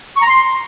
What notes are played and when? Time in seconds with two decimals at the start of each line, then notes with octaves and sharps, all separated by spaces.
0.17 C#6
0.22 A#5
0.28 C6